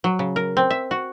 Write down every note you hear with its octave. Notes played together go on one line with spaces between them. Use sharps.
F#3
C#3
A#4
C4
E5
F#4